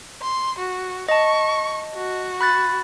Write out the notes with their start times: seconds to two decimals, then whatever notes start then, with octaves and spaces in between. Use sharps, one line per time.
0.22 C6
0.58 F#4
1.09 D#5 A5 C#6
1.95 F#4
2.41 B5 F#6 A6